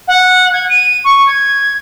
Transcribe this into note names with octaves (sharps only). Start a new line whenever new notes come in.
F#5
G#6
D#7
C#6
G#6